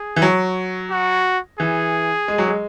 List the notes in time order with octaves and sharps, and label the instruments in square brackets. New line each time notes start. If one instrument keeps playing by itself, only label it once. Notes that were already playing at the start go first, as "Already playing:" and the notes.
Already playing: [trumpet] G#4
[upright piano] E3
F#3
[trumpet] F#4
[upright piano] E3 [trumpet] G#4
[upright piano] G#3
F#3
G#3